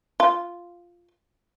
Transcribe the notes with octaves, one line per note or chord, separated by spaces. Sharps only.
F4